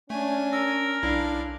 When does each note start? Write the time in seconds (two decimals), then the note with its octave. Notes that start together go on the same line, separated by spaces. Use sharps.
0.10 A3 C#4 D4 G#5
0.53 A#4 E6
1.03 B1 D4 E4 F5